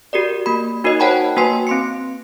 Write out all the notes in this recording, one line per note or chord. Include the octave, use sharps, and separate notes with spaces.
F#4 G4 A#4 D5
A#3 B5
D#4 F#4 A#4 C#5 D#5
C5 C#5 F#5 G5 A5 B5
A#3 F#4 B4 G#5 C6
C4 C6 C#7